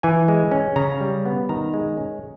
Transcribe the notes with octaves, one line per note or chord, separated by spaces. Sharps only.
E3 G#5
G#3
C#4
C#3 A#5
G3
B3
D#3 A#5
G#3
C#4